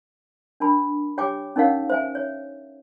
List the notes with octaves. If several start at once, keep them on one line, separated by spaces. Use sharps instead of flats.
D4 A#4 A5 B5
G4 C#5 G5 G#5 D6
C#4 D#4 A#4 C#5 F5 F#5
C5 E5 G#5
C#5